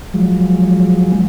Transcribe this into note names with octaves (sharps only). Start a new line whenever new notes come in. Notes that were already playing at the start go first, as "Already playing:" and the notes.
F3 F#3 G#3